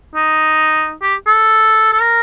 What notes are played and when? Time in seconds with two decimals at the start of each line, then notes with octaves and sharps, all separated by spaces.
0.15 D#4
1.02 G4
1.26 A4
1.93 A4
2.00 A#4